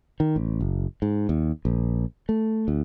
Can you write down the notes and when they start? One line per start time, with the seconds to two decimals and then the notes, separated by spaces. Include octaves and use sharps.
0.20 D#3
0.36 A1
0.61 F#1
1.02 G#2
1.29 D#2
1.65 A#1
2.29 A3
2.68 D2